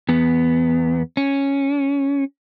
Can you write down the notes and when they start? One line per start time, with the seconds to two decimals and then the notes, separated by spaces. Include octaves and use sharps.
0.09 E2 B3
1.17 C#4